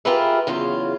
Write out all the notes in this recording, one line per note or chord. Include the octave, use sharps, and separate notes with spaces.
F4 G4 G#4 A#4 B4 E5
E2 C#3 F#3 F4